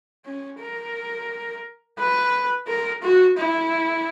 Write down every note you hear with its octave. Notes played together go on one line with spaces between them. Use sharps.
C#4
A#4
B4
A#4
F#4
E4